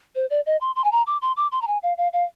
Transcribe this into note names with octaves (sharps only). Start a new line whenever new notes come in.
C5
D5
D#5
C6
C6
G#5
A#5
D6
C6
D6
C6
A#5
G#5
F5
F5
F5